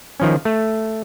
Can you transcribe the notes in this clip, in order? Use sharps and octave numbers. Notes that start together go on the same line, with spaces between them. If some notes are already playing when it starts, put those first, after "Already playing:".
D#3 F3 C#4
A3